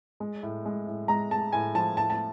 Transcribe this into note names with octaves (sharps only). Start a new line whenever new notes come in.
G#3
A2
G#3
A2
G#3 A#5
G#3 A5
A2 G#5
F3 A5
A2 A5
A5